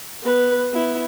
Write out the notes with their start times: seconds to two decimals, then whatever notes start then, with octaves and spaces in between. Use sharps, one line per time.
0.23 B3 B4
0.73 B3 E4